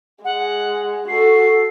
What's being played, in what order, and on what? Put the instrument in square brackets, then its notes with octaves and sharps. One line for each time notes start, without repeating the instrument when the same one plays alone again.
[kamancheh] G#3 [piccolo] F#5
[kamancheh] F#4 A4 [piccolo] C7